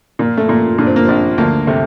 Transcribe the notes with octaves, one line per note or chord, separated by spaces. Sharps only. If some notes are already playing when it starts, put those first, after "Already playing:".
A#2 A#3
A3
A#2 A#3
A#2 D4
C4
A#3
A#1 C4
D2 A#3
C3 A3